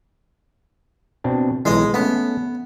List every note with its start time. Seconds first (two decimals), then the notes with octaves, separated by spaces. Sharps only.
1.24 B2 C4 D4
1.65 B1 E3 G#3 D#5
1.94 A3 B3 C#4